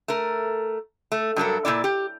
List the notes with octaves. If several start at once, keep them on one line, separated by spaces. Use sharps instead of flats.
A3 A#4
A3
G2 F#3 A4 A#4
A#2 D#3 E4 D5
G4